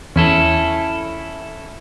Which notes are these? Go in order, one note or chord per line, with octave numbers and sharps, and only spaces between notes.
E2 C#4 E4 A4